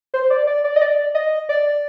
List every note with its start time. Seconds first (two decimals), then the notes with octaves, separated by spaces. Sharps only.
0.14 C5
0.30 D5
0.47 D5
0.64 D5
0.76 D#5
0.82 D5
1.15 D#5
1.49 D5